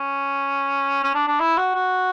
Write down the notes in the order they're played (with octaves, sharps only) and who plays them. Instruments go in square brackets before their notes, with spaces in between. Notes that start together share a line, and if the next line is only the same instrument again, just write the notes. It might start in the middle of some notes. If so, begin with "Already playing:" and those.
Already playing: [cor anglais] C#4
C#4
D4
D4
E4
F#4
F#4